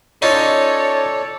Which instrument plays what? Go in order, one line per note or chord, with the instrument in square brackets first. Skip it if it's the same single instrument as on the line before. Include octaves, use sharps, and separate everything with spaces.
[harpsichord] C#4 D#4 F4 [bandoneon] A4 D5 [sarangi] C#5